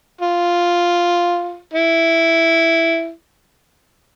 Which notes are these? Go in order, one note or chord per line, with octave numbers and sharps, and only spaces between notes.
F4
E4